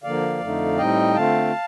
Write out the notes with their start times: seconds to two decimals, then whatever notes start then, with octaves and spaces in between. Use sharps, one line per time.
0.03 D3 F3 A#3 D5 F5
0.41 F2 D3 A3 D#4
0.77 A2 G3 C4 D#4 D#5 G5
1.14 D3 A3 C4 F4 F5 A5